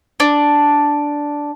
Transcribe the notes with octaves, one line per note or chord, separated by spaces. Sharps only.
D4